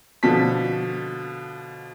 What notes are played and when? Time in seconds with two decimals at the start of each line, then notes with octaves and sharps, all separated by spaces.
0.23 B2 D3 F3 A4 B6